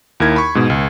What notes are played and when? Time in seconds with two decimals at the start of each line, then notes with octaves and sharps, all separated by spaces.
0.20 D#2 E4 A#4 G#6
0.36 B5 C#6
0.55 G#2 B2
0.70 C#2